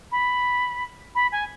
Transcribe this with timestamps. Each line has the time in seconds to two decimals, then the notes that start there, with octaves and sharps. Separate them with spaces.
0.12 B5
1.15 B5
1.32 G#5